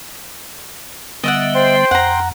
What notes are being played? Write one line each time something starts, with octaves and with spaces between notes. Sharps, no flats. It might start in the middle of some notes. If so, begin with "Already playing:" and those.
D3 G3 B3 D#5 E5 F#5
C5 G5 C6
F2 F#5 A#5